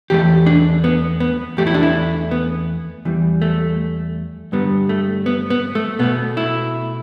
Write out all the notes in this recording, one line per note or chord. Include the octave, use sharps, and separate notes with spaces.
E2 E3 A3 G4
D4
B3
B3
E2 E3 A3 G4
E4
D4
E4
B3
E2 E3 G3
A3
G2 D3 G3 B3
A3
B3
B3
A3
B2 A3 B3
E4